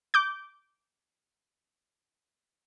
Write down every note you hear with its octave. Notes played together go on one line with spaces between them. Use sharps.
D6 G6